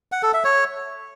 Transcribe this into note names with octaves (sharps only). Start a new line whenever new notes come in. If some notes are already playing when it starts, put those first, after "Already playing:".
F#5
A4
E5
C#5